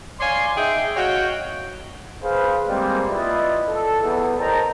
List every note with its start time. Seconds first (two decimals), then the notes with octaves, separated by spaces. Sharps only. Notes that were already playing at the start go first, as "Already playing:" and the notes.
0.19 C#5 D5 F5 G#5 C6
0.56 D#4 G#4 E5 G5
0.95 F#4 C#5 D#5 F5 G5
2.23 G#4 B4 C5 F5
2.68 G3 G#3 A#3 C4
3.09 E4 F4 B4 D5 D#5
3.68 A4
4.01 E2
4.39 A#4 C5 D#5 G5 A5 A#5